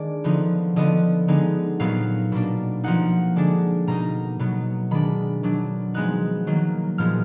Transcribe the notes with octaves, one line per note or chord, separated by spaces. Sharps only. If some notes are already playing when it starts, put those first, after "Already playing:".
Already playing: D#3 G#3 D4 D5
D3 F3 B3 D#4
D3 F3 B3 D#5
D3 G#3 B3 D#4
A#2 F#3 B3 D#4 F5
B2 A#3 D4
F3 A#3 D#4 F#5
D3 G#3 D4
B2 A#3 D#4 A#5
B2 F#3 B3
D#3 G#3 D4 B5
D#3 F#3 D4
F3 G#3 B3 D#4 F#6
D#3 F#3 A#3
A#2 F3 G#3 B3 F6